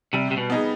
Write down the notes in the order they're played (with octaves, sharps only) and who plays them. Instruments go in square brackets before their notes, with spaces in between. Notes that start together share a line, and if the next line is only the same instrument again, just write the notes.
[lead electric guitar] C3 [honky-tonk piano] G3
[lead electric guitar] C3
B2
[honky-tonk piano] B3 D#4 G#4